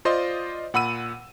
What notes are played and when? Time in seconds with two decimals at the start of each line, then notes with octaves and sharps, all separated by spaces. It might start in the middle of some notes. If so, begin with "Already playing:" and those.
0.05 F4 C5 D5 D#5 C6
0.74 A#2 F#5 B5 E6 D#7